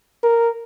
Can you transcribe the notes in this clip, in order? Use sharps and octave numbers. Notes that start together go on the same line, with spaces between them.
A#4